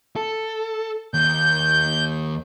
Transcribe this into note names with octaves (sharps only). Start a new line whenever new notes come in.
A4
D#2 G6